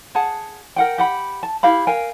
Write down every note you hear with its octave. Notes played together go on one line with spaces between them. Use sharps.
G#4 F#5 A5
A#4 F#5 G5
G4 F#5 B5
A5
E4 G4 F5 B5
A#4 F5 G5 G#5